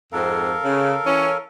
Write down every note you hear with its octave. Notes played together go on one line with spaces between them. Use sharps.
F2 G#2 C4 A4 A#4 F5
C#3
E3 C#4